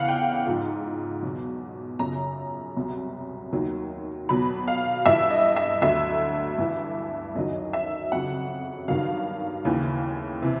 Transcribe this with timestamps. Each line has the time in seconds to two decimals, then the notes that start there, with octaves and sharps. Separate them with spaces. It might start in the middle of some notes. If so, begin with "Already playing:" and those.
Already playing: E2 C#3 E3 F5 F#5
0.08 G5
0.47 G#2 F3
1.23 E2 B2 F#3
1.99 F#2 C#3 F3 A#5
2.76 C2 B2 F#3
3.53 D#2 D#3 F#3
4.29 E2 B2 F#3 B5
4.68 F5
5.06 G2 E3 E5
5.31 D#5
5.56 E5
5.82 D2 D3 F#3 E5
6.58 G2 E3
7.35 F#2 D#3 F#3 D#5
7.73 E5
8.12 F2 C#3 F#3 F#5
8.88 G2 D#3 F#3 F5
9.65 D#2 C#3 E3
10.42 C3 E3